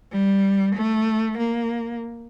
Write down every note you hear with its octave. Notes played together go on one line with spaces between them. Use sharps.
G3
A3
A#3